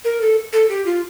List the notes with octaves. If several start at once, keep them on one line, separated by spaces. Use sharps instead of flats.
A#4
A4
A4
G4
F4